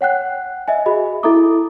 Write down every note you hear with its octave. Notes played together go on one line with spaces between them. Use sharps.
C#5 F#5 G5 F#6
D#5 E5 G#5
F#4 G#4 D#5 B5
E4 A4 E5 A#5 D6 D#6